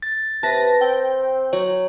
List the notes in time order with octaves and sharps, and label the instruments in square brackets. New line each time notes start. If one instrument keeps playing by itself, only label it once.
[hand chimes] A6
[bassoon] C3 [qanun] B4 [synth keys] A5 A#6
[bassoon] C4 [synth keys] G5
[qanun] F#3 [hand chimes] C#5